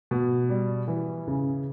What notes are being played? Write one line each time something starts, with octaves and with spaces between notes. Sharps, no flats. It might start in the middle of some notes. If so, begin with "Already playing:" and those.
B2
G3
E3
C#3